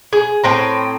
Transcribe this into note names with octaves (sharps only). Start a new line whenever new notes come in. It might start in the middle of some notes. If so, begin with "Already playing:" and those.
G#4
A2 C4 A#5